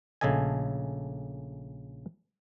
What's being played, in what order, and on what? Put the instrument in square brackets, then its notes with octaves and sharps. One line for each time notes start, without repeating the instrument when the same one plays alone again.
[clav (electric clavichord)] A#1 C#3 A3 A4 D#5 G#5